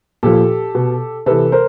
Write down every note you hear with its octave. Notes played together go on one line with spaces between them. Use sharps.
A#2 F3 G4 A4
B2
C3 E3 A4 B4
A#4 C5